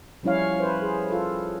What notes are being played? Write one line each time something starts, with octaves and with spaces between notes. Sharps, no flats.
F3 G3 C#4 E4 C#5 F5
B4 C5
G#4
F4 A4